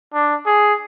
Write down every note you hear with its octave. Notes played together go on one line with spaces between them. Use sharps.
D4
G#4